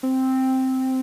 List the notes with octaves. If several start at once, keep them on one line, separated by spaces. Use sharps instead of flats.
C4